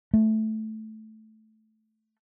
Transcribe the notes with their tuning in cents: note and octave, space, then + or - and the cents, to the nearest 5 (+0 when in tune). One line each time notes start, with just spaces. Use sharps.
A3 -10